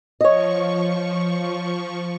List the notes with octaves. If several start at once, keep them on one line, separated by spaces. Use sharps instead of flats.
F3 C#5 D#5 C#6